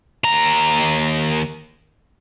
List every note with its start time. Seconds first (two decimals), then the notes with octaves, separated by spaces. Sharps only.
0.24 D#2 A#5